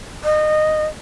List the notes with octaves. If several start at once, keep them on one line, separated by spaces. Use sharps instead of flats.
D#5